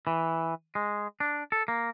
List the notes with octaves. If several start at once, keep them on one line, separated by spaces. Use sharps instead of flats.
E3
G#3
D4
A4
A#3